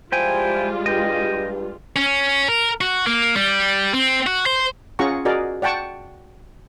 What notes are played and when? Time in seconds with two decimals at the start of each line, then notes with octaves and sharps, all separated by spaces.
0.12 F3 G3 G#3 E4 F4 G5 G#5
0.86 G2 D#5 G5
1.96 C#4
2.48 A#4
2.81 F#4
3.07 A#3
3.36 G3
3.94 C4
4.27 F#4
4.46 C5
4.99 C#4 F4 G#4 F#5 A#5 C#6
5.25 F#4 G#4 A#4 D5 D#5
5.62 D5 F#5 G5 A5 C#6